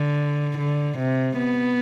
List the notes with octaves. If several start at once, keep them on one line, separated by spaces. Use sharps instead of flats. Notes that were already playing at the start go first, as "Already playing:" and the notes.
Already playing: D3
D3
C3
B3